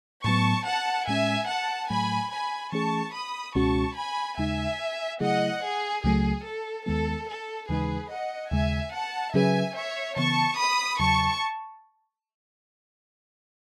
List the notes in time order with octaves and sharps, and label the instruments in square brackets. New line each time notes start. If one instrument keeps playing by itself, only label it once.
[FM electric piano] A2 F#3 B3 [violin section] A5 C#6
[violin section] F#5 A5
[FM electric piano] A2 G#3 C#4 [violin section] E5 G#5
[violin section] F#5 A5
[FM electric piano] A2 F#3 A3 [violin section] G#5 B5
[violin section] G#5 B5
[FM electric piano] E3 A3 C#4 G#4 [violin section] A5 C#6
[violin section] B5 D#6
[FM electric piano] C#2 B2 G#3 C#4 F#4 [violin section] A5 C#6
[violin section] G#5 B5
[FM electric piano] D#2 C#3 G#3 D#4 [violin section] E5 G#5
[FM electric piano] C#3 F#3 A3 E4 G#4 [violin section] D#5 F#5
[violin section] G#4
[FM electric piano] C#2 C#3 F#3 A3 [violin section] G#4
[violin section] A4
[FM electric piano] D#2 D#3 G#3 B3 [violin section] A4
[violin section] A4
[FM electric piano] D#2 C#3 E3 G#3 D#4 [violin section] G#4 B4
[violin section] D#5 F#5
[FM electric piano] D#2 C#3 G#3 [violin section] E5 G#5
[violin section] F#5 A5
[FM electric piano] C#3 F#3 C#4 G#4 B4 [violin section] E5 G#5
[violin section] C#5 E5
[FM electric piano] C#3 E3 B3 [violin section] A5 C#6
[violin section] B5 D#6
[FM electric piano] E2 C#3 F#3 [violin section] A5 C#6